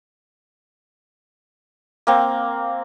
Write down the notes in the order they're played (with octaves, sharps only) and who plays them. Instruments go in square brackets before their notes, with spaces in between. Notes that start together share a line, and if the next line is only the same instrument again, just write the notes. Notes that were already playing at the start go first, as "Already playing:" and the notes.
[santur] A#3 C4